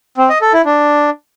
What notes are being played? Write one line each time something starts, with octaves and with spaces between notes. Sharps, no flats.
C4
D#5
A4
E4
D4